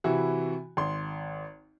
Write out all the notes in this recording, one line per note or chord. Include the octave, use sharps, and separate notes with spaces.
C3 E3 E4 F#4
G#1 C6